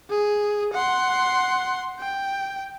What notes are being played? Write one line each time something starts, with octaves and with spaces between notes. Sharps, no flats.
G#4
F#5 C6
G5